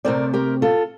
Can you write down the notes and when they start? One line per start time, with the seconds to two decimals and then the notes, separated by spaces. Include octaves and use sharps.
0.05 C3 D#3 A3 C4 A#4 D5
0.34 G4 A#4
0.62 F4 A4